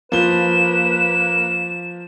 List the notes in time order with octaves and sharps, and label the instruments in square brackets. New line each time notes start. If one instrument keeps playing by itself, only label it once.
[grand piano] F3 G7 [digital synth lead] A#3 [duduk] B4 [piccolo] E7